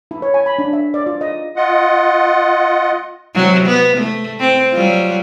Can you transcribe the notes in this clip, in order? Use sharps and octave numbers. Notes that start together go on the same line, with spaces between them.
E4
C#5
G#5
B5
D4
E5
D5
F4
D#5
F4 D#5 F#5
C3 F#3
B3
A3
C4
F#3 G3 F4